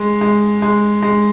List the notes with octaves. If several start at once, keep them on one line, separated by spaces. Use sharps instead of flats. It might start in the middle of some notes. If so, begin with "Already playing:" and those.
Already playing: G#3
G#3
G#3
G#3